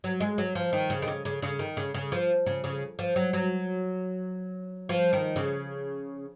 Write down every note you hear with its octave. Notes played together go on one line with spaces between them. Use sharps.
F#3
G#3
F#3
F3
D#3
C#3
D#3
C#3
C#3
C#3
D#3
C#3
C#3
F3
C#3
C#3
F3
F#3
F#3
F3
D#3
C#3